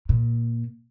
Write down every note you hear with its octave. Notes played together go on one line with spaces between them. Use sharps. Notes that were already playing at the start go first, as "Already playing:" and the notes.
A#2